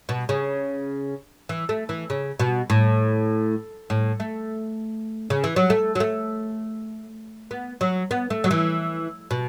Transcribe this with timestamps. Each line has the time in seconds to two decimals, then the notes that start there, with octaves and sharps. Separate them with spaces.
0.09 B2
0.29 C#3
1.49 E3
1.69 A3
1.89 E3
2.10 C#3
2.40 B2
2.70 A2
3.90 A2
4.20 A3
5.30 C#3
5.44 E3
5.56 F#3
5.70 A3
5.95 F#3
6.00 A3
7.51 B3
7.81 F#3
8.11 B3
8.30 A3
8.44 F#3
8.51 E3
9.31 B2